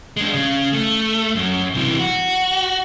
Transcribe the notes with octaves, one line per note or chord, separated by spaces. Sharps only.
G#3 D4
C#3
A3
F#2
C3 E3
F#4